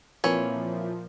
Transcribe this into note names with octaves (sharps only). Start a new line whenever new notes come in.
A#2 E3 F3 C4 A#4 C#5 E5